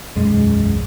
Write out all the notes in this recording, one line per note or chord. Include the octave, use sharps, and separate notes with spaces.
E1 B1 F#2 G#3